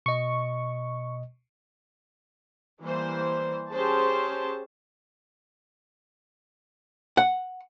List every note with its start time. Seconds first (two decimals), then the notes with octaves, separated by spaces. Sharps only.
0.06 B2 D#5 C#6
2.81 E3 G3 A#3 C5
3.72 C#4 G4 G#4 C5 A5
7.17 F#5